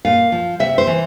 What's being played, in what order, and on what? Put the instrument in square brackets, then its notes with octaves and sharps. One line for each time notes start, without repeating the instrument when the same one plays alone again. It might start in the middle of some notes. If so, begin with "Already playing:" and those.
[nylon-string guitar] A#2 F5
F3
C3 E5
C5
E3